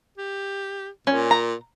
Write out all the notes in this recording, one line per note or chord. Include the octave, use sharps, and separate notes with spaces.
G4
A#2 C#4
A#5